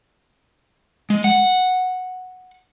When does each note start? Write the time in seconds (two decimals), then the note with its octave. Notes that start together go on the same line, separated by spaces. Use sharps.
1.10 G#3
1.24 F#5